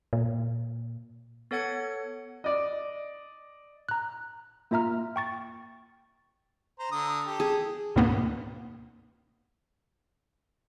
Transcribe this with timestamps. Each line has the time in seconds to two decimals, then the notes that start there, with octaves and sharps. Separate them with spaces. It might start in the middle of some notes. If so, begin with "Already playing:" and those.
0.13 A#2
1.51 B3 A4 C#5 F#5 G#6 C#7
2.44 D5 D#5
3.89 A#5 F#6
4.71 A#3 F4 E5 A#5 F6
5.16 G5 C#6 A6
6.79 C5 A#5
6.92 D3 A#5 D#6
7.27 G4 A4
7.40 G#4
7.96 D2 G#2 B2 D#3 A#3 B3